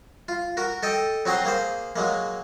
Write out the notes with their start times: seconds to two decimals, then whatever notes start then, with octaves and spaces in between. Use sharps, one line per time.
0.28 F4
0.57 F#4 A#4
0.83 A4 D#5 G5
1.26 F#3 C4 F#4 G#4 A#5 C6
1.45 A#3 G#4 C5
1.96 F#3 G#3 A#3